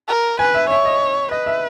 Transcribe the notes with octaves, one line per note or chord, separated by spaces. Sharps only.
A#4
B4 G#5
E5
C#5 E5
D#5
B4 D#5
E5